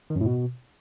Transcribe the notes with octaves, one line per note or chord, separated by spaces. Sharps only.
D#3
F#2
A2
B2